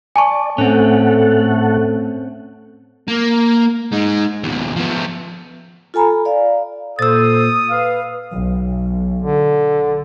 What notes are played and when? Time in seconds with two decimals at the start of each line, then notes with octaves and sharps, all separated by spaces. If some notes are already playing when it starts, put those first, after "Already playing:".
0.16 D5 G#5 A5 C#6
0.58 A2 A3 C4 C#4 A4 F#5
3.08 A#3
3.93 G#3 D#4
4.43 D#2 B2
4.77 F3 B3
5.94 F4 A4 G#5 A#5 B5
6.25 D5 F5
6.99 A#2 A4 C5 D#6 E6 A6
7.70 B4 F5
8.32 B1
9.22 D3